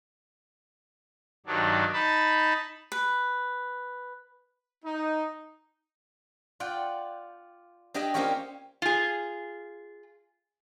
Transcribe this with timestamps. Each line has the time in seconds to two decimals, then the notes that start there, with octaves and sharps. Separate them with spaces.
1.46 G2 D#3 F#3 D4
1.93 D#4 A5 B5
2.92 B4
4.84 D#4
6.60 F4 D5 F#5 G5
7.94 D4 G4 G#4 D#5 E5 G5
8.14 A#3 C4 C#4 F4 G4 C#5
8.82 F4 G#4